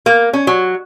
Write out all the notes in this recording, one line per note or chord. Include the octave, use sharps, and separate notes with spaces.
A#3
C#4
F#3